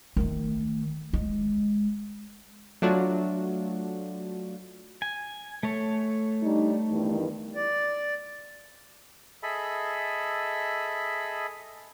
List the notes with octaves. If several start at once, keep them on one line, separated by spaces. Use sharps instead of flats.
D#3 A3
G#3
F#3 A3 D4 F4 F#4
G#5
A3 A4 C#5
G3 D4 D#4
E2 G2 D#3
D5
G#4 A4 D#5 E5 B5